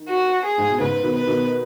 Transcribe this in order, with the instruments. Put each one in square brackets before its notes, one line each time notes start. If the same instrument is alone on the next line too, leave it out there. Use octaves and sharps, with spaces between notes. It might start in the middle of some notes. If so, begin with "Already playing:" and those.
Already playing: [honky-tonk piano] D#3
[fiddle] F#4
G#4
[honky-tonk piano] G#2
B2
[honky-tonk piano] G#2 C#3 [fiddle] B4
[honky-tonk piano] B2 D#3
[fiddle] B4
[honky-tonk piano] B2 D#3